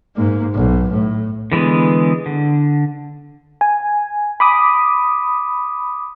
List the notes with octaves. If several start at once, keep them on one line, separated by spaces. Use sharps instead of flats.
G#2 A#3
B1
A2
D3 E3 G#3 B3
D3
G#5
B5 D6 D#6